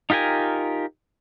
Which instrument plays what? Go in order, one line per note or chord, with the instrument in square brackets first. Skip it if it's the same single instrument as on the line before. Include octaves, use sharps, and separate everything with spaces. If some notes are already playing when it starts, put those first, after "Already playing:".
[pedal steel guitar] D#4 F4 G4 A#4 G#5